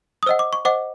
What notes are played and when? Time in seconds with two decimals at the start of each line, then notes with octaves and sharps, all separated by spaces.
0.23 D#6
0.26 C5 D#5 F#5 E6
0.39 D6
0.53 C#6
0.65 C5 D#5 F#5 D6